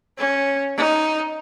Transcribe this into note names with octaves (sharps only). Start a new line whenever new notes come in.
C#4
D#4